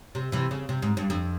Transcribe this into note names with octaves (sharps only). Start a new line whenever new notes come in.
C3
C3 E3
C#3
C3
G#2
G2
F2